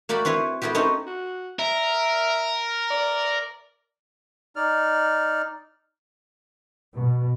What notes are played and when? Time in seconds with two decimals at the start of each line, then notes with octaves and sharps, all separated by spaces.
0.09 A#3 F#4 D5 G5 B5
0.25 C4 E4 B4 C#5
0.62 A3 B3 E4 F#4 G4
0.75 C4 C#4 D#4 B4 C#5 D#5
1.06 F#4
1.59 A#4 E5
2.90 D5
4.56 D#4 D5 F6
6.94 B2